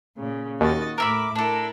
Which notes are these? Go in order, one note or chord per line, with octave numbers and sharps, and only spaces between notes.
A#2 C#3
D#2 F#4 D#5 A6
A2 A#4 E5 B5 D6
D4 E4 A4 A#4